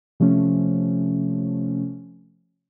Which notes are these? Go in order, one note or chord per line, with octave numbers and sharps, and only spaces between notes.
C3 F3 A3 C#4